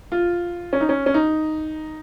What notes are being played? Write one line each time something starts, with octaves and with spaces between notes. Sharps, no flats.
F4
C#4
D#4
C#4
C#4
D#4